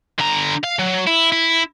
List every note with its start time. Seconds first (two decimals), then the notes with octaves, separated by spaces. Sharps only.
0.19 D3 A#5
0.64 F5
0.79 F#3
1.07 E4
1.32 E4